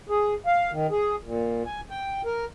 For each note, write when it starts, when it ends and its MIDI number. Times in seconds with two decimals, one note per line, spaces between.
0.09 0.34 68
0.46 0.71 77
0.72 0.87 51
0.91 1.16 68
1.24 1.63 46
1.66 1.81 80
1.90 2.22 79
2.25 2.45 70